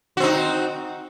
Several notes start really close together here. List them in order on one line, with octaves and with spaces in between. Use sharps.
F#4 C4 D#4